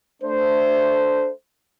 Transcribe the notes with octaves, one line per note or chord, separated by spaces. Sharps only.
A3 D4 C5